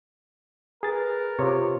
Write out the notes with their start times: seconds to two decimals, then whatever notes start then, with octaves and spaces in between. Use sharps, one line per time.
0.83 G#4 A#4 B4 A6
1.39 C3 F4 C#5